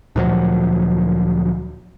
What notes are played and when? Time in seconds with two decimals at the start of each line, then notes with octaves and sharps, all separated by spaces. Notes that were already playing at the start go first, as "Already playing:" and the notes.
0.16 D2 A#2 F3 F#3